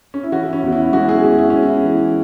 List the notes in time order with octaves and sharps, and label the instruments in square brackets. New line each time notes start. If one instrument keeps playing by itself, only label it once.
[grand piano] C#4
E4
E3 C#4 F#4
E4
C#4
E2 F#4
E4
G#3 C#4 F#4
E4 G#4
E2 C#4 F#4
E4
G#3 C#4
E4
E3